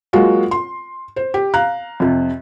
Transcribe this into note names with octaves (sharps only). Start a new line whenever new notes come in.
F#3 G#3 A#3 F4 F#4
C6
C5
G4
F5 A#5 F#6
F2 C3